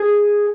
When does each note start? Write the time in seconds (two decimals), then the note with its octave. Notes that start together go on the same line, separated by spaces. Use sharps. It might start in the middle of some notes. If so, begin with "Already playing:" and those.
Already playing: G#4